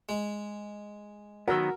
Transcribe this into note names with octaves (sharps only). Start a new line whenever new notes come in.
G#3
D#3 F#3 B3 F#4 A#4 E6